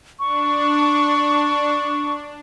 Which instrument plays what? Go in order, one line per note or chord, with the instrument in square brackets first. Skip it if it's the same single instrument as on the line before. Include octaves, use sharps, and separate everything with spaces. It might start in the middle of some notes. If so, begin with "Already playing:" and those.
[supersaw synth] D4 [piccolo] C#6